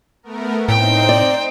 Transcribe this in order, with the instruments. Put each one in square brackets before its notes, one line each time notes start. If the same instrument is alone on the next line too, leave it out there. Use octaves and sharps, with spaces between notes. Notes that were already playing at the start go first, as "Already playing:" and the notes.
[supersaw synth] A3 B3 A#4
[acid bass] A2 [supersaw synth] C4 D#4 C5 [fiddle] G5
[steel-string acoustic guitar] D5